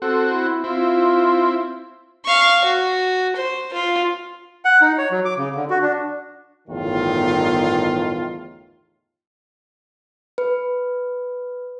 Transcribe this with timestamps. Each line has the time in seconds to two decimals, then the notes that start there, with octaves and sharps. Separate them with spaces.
0.02 C4 F#4 A4
0.25 E4
0.64 C4 E4 F4
2.25 F5 C#6
2.65 F#4
3.36 C5
3.73 F4
4.65 F#5
4.81 D#4
4.98 C#5
5.11 F#3
5.25 D6
5.37 C#3
5.55 D3
5.70 F#4
5.82 D4
6.68 G1 E2 A2 D#3 F4
10.38 B4